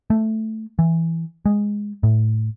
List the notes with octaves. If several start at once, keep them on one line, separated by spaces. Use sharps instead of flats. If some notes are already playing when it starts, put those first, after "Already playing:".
A3
E3
G#3
A2